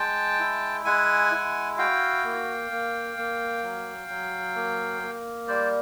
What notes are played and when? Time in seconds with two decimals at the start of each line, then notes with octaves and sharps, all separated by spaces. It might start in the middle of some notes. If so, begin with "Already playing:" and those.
Already playing: G#3 G5 A5
0.39 E4
0.85 G#3 F#5 G#5
1.32 E4
1.78 F#4 F5 G5
2.24 A#3
2.71 A#3
3.17 A#3
3.63 F#3
4.09 F#3
4.55 A#3
5.01 A#3
5.48 G3 C5 D5